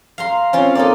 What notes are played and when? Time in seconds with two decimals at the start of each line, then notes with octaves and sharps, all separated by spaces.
0.18 F5 A#5 C6
0.53 C4 C#4 F4
0.75 A#3 D#4 A4 D5